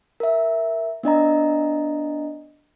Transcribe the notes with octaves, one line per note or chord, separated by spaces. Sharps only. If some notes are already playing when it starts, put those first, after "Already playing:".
A#4 E5
B3 D4 D#5 A#5